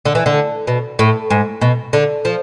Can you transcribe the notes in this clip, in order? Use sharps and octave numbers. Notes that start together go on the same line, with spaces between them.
D3
E3
D3
B2
A2
G#2
B2
D3
F3